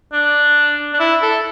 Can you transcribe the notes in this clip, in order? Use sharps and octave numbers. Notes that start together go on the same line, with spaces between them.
D4
D4
E4
A4